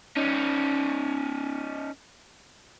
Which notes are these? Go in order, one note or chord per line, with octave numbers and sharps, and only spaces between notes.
C#4 D#4